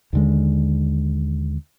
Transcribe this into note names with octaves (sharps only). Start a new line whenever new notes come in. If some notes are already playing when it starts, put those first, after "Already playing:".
D#2 D3 G#3